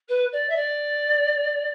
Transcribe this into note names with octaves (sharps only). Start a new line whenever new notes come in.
B4
D5
E5
D5